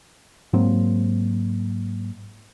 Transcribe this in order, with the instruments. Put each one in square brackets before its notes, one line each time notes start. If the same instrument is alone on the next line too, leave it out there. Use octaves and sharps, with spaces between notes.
[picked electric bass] G#2 F#3 A#3 C4